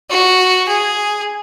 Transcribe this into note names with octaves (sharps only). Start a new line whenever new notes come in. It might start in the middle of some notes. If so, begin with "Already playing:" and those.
F#4
G#4